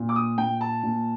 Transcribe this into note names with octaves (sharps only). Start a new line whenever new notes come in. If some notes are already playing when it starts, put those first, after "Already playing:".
Already playing: A#2
D6
D#6
A#2 G5
A5
A#2